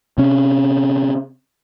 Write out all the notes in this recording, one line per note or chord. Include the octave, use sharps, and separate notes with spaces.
C3 C#4